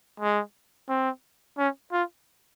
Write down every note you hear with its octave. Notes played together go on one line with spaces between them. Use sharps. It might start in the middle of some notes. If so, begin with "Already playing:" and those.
G#3
C4
C#4
F4